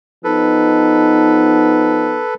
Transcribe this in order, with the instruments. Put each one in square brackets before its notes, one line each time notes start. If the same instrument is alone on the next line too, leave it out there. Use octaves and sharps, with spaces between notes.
[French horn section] F3 B3 D#4 [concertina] A4 B4